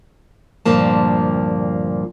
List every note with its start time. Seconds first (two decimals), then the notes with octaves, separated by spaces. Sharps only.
0.66 D2 G2 A#2 F3 A#3 A5